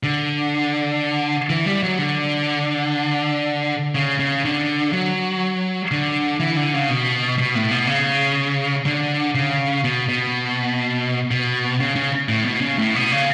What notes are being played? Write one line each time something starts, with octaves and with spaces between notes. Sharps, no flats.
D3
E3
G3
F#3
D3
C#3
C#3
D3
F#3
D3
E3
D3
C#3
B2
B2
A2
B2
C#3
D3
C#3
B2
B2
B2
C#3
C#3
A2
B2
C#3
A2
B2
C#3